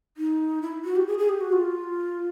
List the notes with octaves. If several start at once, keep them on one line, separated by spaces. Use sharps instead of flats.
D#4
E4
F#4
G4
G#4
G#4
G4
F#4
F4